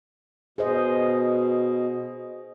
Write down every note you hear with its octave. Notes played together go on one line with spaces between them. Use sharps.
B2 G#4 C5 D#5